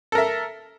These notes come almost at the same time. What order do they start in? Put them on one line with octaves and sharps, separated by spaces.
A4 A#4 E5